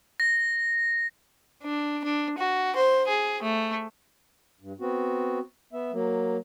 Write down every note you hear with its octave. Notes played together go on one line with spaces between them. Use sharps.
A#6
D4
D4
F#4
C5
G#4
A3
G2
B3 C4 F#4
B3 E5
F#3 A#3